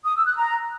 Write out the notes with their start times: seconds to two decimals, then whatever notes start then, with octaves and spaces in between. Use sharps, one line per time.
0.05 D#6
0.15 E6
0.26 F#6
0.36 A#5